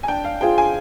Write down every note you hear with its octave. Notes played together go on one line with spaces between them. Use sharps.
G#5
D4 G5
F5
F4 G#4 C5 G5
G#5